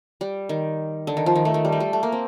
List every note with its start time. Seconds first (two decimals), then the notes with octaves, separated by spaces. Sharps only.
0.21 G3
0.49 D#3
1.07 D3
1.17 D#3
1.26 F3
1.35 D#3
1.45 A3
1.54 D#3
1.65 G3
1.72 A3
1.80 G3
1.93 A3
2.03 A#3
2.12 C4